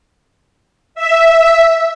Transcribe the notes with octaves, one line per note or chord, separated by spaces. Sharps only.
E5